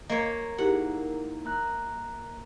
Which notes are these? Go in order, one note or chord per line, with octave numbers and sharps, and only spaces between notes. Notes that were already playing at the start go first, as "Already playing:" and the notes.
A#3 C#5 D#5
D#4 E4 G4 G#4 A#4 F#5
A#3 A#5 F#6